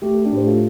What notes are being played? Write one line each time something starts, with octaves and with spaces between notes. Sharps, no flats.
A3 G4
A4
D4 G4
A2
C5
F4 A4